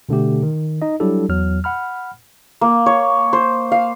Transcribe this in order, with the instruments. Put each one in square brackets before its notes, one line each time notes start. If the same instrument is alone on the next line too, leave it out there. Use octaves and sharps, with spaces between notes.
[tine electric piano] B2 D3 A3 G4
D#3
D#4 D#5
F#3 G3 D4 E4 G4 A4
E2 F#3 F6
F#5 B5 F6
[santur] A#3
C#5
C5
F5